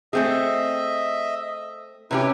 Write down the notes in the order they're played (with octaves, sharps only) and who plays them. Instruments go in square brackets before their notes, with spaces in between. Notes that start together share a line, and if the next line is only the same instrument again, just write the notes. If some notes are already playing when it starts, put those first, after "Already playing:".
[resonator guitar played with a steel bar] A3 C4 G#4 [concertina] D#5 E5
[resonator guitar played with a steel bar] C3 C#4 G4 [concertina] E4 B4